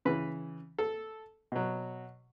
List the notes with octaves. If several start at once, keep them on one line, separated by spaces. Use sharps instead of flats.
C#3 E3 B4
A4
B2 F#3